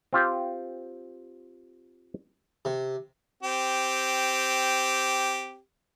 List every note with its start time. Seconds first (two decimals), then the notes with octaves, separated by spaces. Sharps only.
0.13 C4 F4 G4
2.65 C3
3.43 C4 G4